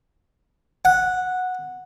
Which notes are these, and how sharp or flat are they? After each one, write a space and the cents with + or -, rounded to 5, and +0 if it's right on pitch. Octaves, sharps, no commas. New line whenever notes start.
F#5 -10